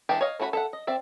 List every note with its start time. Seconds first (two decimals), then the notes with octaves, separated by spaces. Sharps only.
0.09 E3 G#3 D4 G4
0.21 C#5 D#5 F5
0.40 A3 C#4 F#4 B4 B5
0.53 A4 E5 F#5
0.73 D#5
0.87 C4 D5 E5